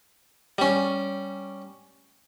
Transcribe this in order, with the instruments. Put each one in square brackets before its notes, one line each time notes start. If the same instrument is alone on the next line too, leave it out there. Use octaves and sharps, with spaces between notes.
[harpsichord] G3 C#4